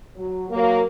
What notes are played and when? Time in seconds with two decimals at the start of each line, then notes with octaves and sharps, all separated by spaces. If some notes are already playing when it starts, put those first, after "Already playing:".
0.16 F#3
0.51 F#3 A#3